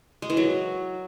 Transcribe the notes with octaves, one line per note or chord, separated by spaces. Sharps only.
G#3
E3
F#3